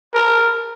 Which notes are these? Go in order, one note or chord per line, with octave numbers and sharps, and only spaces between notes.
A#4